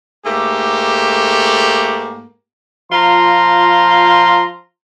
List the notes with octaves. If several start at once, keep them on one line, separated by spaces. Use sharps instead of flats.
G#2 A3 A#3 G4
F3 F4 A#5 C6